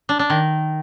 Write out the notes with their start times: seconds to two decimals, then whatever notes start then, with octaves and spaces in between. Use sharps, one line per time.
0.09 D4
0.19 D4
0.30 D#3